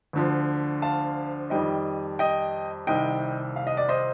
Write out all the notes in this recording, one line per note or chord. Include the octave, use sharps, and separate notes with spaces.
D2 D3 F3
F5 A5
F2 D#3 G3 D#5 G5
D#5 G5
C2 C3 D#3 G3 D#5 G5
F5
D#5
D5
C5 D#5